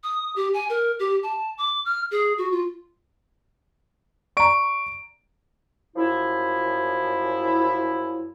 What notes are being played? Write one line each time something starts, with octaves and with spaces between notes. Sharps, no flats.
D#6
G4
G#5
A#4
G4
A5
D6
F6
G#4
F#4
F4
D5 A#5 C#6 D7
F#2 F3 E4